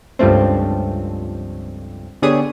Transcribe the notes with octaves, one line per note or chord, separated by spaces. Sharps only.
C#2 G2 F3 A3 C4
D3 B3 G4 G#4 C#5 D#6